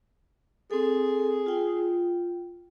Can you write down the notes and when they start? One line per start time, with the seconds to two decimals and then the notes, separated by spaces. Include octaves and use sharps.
0.71 C4 G#4 A4
1.46 F4 G5